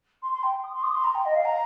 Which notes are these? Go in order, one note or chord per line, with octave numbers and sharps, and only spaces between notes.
C6
C6
G5
D#6
C6
D#6
C6
A#5
G5
D#5
F5
A#5